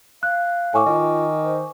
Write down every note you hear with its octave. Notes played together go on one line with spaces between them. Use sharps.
F5 F#6
A2 G#5 C#6 D6
D#3 F4
C5